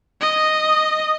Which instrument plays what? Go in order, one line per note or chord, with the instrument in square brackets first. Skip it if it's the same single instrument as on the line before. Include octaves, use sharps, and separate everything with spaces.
[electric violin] D#5